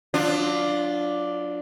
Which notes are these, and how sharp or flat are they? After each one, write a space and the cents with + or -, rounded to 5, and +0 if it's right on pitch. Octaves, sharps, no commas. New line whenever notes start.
F#3 -30 D4 +0 F4 +0